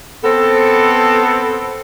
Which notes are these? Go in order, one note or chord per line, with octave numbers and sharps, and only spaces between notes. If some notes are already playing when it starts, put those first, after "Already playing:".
B3 C4 A4